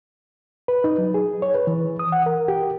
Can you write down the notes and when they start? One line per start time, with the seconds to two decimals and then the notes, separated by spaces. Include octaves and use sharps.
0.68 B4
0.84 D#4
0.98 F#3
1.14 G#4
1.42 C#5
1.54 B4
1.67 E3
1.99 D#6
2.12 F#5
2.26 A#4
2.48 G4